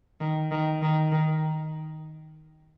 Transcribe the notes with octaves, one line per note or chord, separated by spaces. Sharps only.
D#3
D#3
D#3
D#3